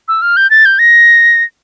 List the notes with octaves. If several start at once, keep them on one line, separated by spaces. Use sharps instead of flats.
E6
F6
G6
A6
G6
A#6